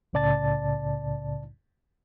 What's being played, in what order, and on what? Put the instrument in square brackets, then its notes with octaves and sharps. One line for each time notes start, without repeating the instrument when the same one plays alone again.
[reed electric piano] C2 A2 C#3 D5 A5 A6